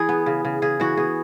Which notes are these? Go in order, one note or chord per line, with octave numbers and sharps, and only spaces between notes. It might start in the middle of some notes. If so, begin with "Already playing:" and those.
Already playing: E3 G#4
B3
C#3
C#3
C#3 G#4
E3 F#4
B3 G#4